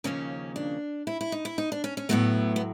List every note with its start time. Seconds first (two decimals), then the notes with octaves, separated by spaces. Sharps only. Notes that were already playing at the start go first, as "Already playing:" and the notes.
0.04 D#2 C#3 F3 A#3 C#4
0.56 D4
1.07 E4
1.21 E4
1.32 D#4
1.45 E4
1.58 D#4
1.72 D4
1.84 C#4
1.97 C#4
2.09 A2 F#3 A3 B3
2.56 B3